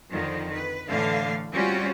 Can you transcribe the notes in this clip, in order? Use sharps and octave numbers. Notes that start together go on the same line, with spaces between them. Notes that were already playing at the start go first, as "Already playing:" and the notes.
F2 D3 D#3 F3
B4
A2 D3 E3 A3 F5
G3 C4 C#4 F4 F#4